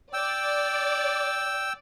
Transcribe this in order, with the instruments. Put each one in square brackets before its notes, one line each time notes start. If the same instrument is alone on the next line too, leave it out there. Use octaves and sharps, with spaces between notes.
[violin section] D5 [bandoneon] G5 E6